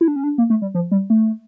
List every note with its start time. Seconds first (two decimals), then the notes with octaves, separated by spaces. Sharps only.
0.01 E4
0.08 D4
0.16 C#4
0.24 D4
0.38 A#3
0.50 A3
0.62 G3
0.74 F3
0.91 G3
1.10 A3